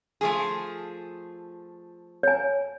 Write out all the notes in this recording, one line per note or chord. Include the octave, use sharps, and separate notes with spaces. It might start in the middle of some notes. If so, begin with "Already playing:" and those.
F3 A3 G#4
C#5 G#5